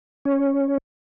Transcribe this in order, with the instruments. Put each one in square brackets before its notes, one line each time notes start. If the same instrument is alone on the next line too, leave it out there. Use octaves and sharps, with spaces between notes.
[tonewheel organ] C#4 C#5